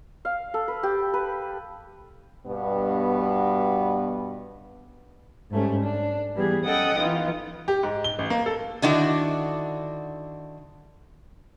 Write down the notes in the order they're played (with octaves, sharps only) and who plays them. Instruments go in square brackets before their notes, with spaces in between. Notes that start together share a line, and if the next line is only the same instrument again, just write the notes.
[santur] F5
A4
B4
G4
B4
[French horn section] G2 B2 B3
[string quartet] G#2 G3 A3 C#4
D4
E3 G3 B3 G#4
C#4 A4 D#5 F#5 G5 D#6
E3 B3 D#4 F4
[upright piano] G4
G#2
G7
A1
A#3
A4
[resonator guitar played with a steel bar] D3 D#3 D4 E4 F#4